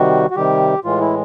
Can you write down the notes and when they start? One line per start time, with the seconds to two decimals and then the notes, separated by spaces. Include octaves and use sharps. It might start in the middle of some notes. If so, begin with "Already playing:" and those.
Already playing: C3 D#3 G3 F#4
0.30 F#4
0.36 C3 D#3 G3 G4
0.84 A2 E3 G#3 F4
1.00 E4